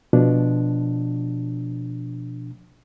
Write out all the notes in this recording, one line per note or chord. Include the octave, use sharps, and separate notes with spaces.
B2 F3 D4